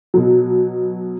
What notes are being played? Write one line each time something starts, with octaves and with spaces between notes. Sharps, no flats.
B2 F#3